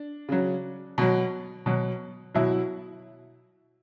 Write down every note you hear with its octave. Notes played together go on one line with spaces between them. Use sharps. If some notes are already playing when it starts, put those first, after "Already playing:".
Already playing: D4
C#3 F#3
B2 F#3
B2 F#3
B2 F#3 E4